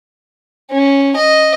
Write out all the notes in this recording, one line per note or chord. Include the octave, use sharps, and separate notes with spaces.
C#4
D#5